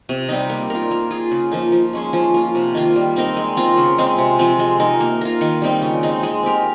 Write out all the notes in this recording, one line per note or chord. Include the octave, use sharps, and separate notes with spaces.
C3
G3 C4 D#4
A#3
F4 A#4
A#3
F4 G#4
C#3
F3 A#3 D#4
F3
G#3 C#4 G#4
F3
A#3 F4
C3
D#3 A#3 F4
G3
C4 D#4 A#4
G#3
C4 F4 A#4
C#3
G#3 C4
C3
F3 C4
G#3
D#4 A#4
A#3
F4 A#4
D#3
G3 C4 D#4
C#3
G#3 C4 D#4
G#3
C4 G4 A#4